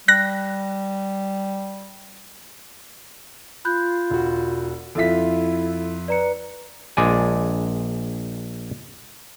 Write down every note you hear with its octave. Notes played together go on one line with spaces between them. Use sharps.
G3 F#6 A#6
F4 B5 F#6 G6
E1 F#4
F2 E4 F4 A4 E5 B6
B4 D5 A#5 C#7
A#1 G#3 D5 G#5